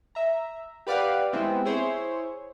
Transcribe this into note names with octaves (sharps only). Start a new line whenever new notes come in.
E5 A#5
G4 B4 D5 F5 F#5
G#3 B3 C4 E4 G4
E4 G#4 C5 C#5